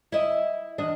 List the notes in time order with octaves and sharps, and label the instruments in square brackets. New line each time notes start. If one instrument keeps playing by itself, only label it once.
[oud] E4 D#5
E2 D4 D#5